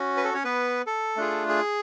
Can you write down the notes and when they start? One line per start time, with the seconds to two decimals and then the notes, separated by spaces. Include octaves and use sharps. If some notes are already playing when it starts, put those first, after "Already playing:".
Already playing: C#4 F#4
0.17 B4
0.24 A4
0.34 C#4 C#5
0.45 B3 B4
0.87 A4
1.17 A3 D4 F4 G#4
1.49 G#4